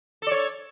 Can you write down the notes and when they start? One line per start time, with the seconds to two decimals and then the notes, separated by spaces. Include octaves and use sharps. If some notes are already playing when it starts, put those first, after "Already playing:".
0.22 A4
0.27 D5
0.31 C#5